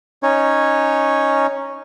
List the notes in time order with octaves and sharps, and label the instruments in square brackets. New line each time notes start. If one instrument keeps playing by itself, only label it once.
[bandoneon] C#4 D#4 C#5